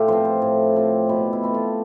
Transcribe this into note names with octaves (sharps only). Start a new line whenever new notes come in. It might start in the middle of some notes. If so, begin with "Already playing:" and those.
Already playing: A2 F4 G4
F3 C4 C5
C5
A2
F3 C4
B2 B4
E4
A3 C4
F4